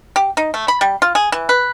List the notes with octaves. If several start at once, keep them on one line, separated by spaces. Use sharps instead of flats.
G4
D#4
A3
B5
G3
F4
G#4
E3
B4